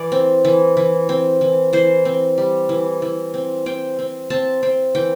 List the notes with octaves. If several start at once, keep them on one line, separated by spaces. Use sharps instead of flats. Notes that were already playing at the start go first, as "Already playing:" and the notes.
Already playing: E3 D5
C4
E3
E3
C4
E3
E3 C5
C4
G3
E3
E3
C4
C4 G5
C4
C4 A5
C4
E3 G5